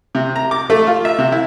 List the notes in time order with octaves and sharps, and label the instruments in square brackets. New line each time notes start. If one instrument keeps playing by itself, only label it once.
[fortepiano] C3
A#5
D6
A3
F4
E5
C3
E4